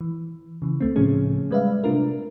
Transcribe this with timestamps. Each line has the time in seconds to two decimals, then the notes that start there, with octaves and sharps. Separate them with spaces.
0.01 E3
0.62 C#3 E3
0.81 C#2 A3 C4
0.96 A2 C#3 F3 C#4 G#4
1.51 G3 G#3 B4 D5 E5 F5
1.84 C3 A3 D4 F4 A#4